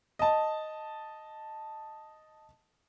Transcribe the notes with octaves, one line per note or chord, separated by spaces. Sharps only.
D#5 A5